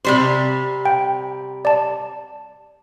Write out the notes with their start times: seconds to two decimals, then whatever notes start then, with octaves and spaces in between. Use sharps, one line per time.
0.05 C3 G3 C5
0.85 G5
1.65 D5 A5